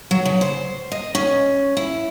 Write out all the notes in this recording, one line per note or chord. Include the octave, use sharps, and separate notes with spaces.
F#3
C#3
C5
D#5
C#4
E4